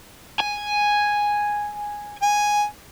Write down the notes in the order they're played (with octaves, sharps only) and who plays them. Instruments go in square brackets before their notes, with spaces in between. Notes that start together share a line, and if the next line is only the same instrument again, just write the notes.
[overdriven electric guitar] G#5
[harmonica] G#5